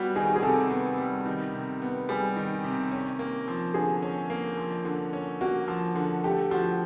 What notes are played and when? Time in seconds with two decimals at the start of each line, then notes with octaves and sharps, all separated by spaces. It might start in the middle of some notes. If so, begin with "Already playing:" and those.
Already playing: G3 B3 F#4
0.15 D#3 G#4
0.36 G#4
0.42 C3 A4
0.70 B3
0.98 G3
1.26 D#3
1.53 C3
1.82 B3
2.09 G3 G#4
2.36 D#3
2.64 C3
2.91 C#4
3.19 A#3
3.48 F3
3.74 D3 G#4
4.02 C#4
4.30 A#3
4.57 F3
4.85 D3
5.13 C#4
5.41 A#3 F#4
5.68 F3
5.96 D3
6.24 A3 G4
6.51 F3 F#4